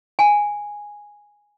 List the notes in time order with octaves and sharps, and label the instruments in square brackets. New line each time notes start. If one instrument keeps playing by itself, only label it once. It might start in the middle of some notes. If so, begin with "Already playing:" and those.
[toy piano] G#5